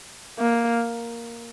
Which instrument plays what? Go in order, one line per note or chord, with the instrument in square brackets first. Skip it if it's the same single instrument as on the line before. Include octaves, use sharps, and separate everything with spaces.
[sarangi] A#3